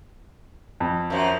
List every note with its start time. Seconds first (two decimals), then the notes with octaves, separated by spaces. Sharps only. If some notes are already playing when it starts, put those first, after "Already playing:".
0.80 F2
1.10 F#2 F3